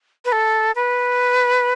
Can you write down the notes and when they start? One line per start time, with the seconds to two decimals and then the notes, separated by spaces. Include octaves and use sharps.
0.25 B4
0.32 A4
0.75 B4